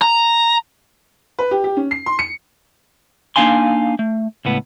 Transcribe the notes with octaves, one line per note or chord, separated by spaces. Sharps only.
A#5
B4
G4
G4
C#4
C7
C6
C#7
A#3 D4 D#4 F5 G#5 C6
A3
C#2 A2 B3